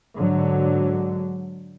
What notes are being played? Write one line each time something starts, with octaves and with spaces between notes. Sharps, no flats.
G#2 D3 F#3